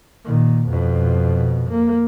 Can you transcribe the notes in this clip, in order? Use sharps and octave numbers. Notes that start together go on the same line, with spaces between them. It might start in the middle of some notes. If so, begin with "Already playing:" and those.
A#2 D#3
F2 B2
A#3